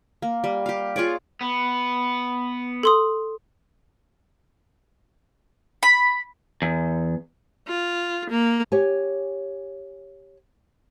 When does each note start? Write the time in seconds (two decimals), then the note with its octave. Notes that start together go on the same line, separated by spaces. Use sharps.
0.22 A#3
0.44 G3
0.66 G4 F5
0.96 F4 G#4 C#5 D5
1.41 B3
2.83 A4 C6 D#6
5.83 B5
6.62 E2
7.67 F4
8.30 A#3
8.72 G4 C#5 G#5